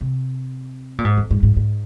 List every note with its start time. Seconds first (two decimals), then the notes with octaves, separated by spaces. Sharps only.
0.01 C3
0.98 A#2
1.05 G#2
1.17 F2
1.31 G#2
1.43 G#2
1.57 G#2